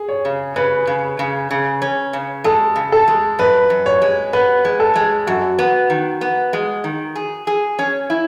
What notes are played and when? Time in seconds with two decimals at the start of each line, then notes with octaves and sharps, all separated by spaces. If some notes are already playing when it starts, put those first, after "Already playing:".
Already playing: G#4
0.09 C#5
0.25 C#3
0.56 C#3 B4
0.87 C#3
1.19 C#3
1.51 C#3
1.82 C#4
2.13 C#3
2.44 G#3 A4
2.76 C#3
2.92 A4
3.08 G#3
3.39 F#2 B4
3.70 F#2
3.86 C#5
4.02 G#3
4.33 B3 B4
4.65 G#3
4.80 A4
4.96 G#3
5.27 F#2 F#4
5.59 B3
5.90 D#3
6.21 B3
6.53 G#3
6.84 D#3
7.16 G#4
7.47 G#4
7.79 C#4
8.10 E4